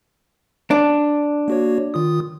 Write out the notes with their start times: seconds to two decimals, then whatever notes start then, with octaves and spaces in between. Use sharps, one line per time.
0.71 D4
1.48 A#3 F#4 C#5
1.94 D#3 F4 D#6